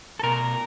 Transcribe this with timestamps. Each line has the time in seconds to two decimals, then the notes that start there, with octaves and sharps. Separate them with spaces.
0.19 A4
0.23 B2 A#4